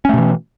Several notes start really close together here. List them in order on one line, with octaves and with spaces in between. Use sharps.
C#4 A3 B2 E3